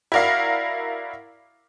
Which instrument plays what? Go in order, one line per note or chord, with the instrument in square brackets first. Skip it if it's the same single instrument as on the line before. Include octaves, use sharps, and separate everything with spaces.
[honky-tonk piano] E4 F#4 A#4 D5 F5